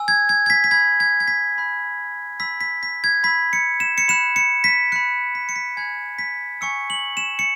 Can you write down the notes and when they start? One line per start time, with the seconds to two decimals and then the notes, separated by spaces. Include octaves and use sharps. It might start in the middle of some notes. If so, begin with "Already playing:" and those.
Already playing: G#5 E6
0.08 G#6
0.29 G#6
0.46 G#6
0.50 B6
0.64 B6
0.71 B5 E6 G#6
1.00 G#6
1.20 G#6
1.28 B6
1.55 G#5 B5 F#6
2.40 B5 E6 B6
2.61 B6
2.83 B6
3.04 G#6
3.24 B5 E6 B6
3.53 C#7
3.80 E7
3.98 C#7
4.08 B5 F#6 E7
4.36 C#7
4.64 B6
4.92 B5 F#6 C#7
5.35 B6
5.49 C#7
5.56 B6
5.77 G#5 B5 F#6 G#6
6.19 B6
6.61 G#5 C#6 E6 C#7
6.90 F#7
7.17 E7
7.39 C#7